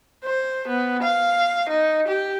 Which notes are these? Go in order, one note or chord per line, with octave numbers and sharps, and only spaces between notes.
C5
B3
F5
D#4
G4